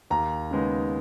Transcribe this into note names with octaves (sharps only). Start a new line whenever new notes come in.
D#2 A#5
C#3 G#3 B3 D#4